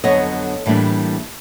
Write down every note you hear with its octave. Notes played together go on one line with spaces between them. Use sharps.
F2 D3 F#3 B3 C#5 D#5
A2 E3 G3 A#3 D4